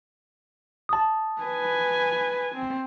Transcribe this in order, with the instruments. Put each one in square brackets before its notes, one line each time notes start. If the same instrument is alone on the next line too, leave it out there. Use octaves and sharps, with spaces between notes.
[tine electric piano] A5 D#6
[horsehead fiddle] B4 G#5
C4